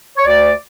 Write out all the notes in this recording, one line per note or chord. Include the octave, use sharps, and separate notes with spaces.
C#5
D2 D5